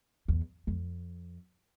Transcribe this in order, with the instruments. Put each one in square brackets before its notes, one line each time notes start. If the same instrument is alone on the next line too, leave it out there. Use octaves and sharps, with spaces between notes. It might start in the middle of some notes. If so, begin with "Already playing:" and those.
[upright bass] E2
F2